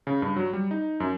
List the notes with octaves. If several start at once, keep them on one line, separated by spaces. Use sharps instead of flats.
C#3
G2
F#3
G3
D#4
F#2